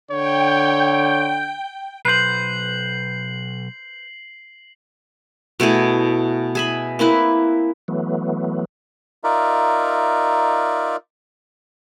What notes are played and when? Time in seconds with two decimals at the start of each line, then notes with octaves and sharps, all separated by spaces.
0.11 D3 C#5 G5
2.05 B1 B4 C5 C7 F#7
5.60 B2 A3 E4 G#4
6.55 G#4 E5 B5
6.99 A#3 C4 E4 B4
7.88 E3 F#3 A3 B3
9.24 D#4 F4 A#4 D5 E5